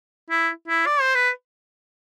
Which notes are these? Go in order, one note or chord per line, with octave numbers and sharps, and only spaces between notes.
E4
E4
D5
C5
B4